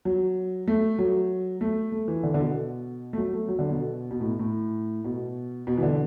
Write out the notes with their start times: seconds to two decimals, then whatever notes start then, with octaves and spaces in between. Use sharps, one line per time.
0.05 F#3
0.68 A3
0.99 F#3
1.61 A3
1.92 A3
2.08 E3
2.23 D3
2.34 D3
2.39 B2
3.13 A3
3.17 F#3
3.33 A3
3.48 F#3
3.59 D3
3.70 B2
4.11 B2
4.21 A2
4.39 A2
5.05 B2
5.67 B2
5.78 E3
5.83 D3